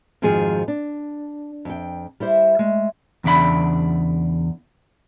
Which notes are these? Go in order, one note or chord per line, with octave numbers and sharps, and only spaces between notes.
F2 G#2 D#3 F3 F#4 G#4
D4
F2 G5
G3 E4 C5
G#3 A3
E2 C#3 D4 E5 B5